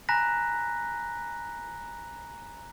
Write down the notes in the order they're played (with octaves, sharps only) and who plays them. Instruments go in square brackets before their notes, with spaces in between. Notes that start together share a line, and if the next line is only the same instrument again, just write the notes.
[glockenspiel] G#5 A#5 B5 F#6 A#6 B6